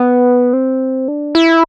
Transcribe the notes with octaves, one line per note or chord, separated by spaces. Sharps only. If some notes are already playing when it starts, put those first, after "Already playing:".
Already playing: B3
C4
D4
E4